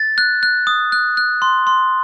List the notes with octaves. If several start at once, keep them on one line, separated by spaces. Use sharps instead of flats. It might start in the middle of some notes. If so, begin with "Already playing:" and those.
Already playing: A6
F#6
F#6
D#6
F#6
F#6
C6
C6